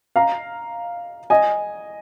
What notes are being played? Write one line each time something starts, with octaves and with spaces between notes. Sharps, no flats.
F5 A#5
D#5 G#5